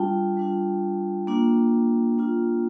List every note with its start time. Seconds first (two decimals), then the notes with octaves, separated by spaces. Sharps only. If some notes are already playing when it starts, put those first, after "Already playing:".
Already playing: G3 D4 F4 G5 A5
0.37 G3 D4 F4
1.27 A#3 D4 F4
2.18 A#3 D4 F4